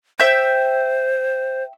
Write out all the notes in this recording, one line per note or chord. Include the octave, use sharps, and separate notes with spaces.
C5 E5 G5 G6